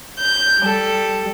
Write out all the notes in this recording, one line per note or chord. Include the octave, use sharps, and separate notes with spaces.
G6
G3 A4